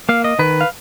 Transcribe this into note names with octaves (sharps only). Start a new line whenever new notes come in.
A#3 F5
D#5
D#3 B4
F5